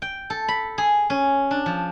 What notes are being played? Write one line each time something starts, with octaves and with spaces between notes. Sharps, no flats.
G5
A4
B5
G#4
C#4
D4
F3